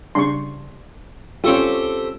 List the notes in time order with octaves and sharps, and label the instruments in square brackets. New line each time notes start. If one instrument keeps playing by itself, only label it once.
[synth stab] C#3 G3 D4 [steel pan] C6 C#6
[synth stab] G3 C#6 [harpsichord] A3 C4 G4 [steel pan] C#4 F4